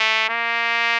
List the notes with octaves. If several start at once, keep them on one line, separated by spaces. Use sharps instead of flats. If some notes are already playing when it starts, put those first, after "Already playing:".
Already playing: A3
A#3